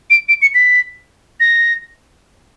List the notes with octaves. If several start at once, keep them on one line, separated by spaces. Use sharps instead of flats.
D7
D7
C#7
B6
A#6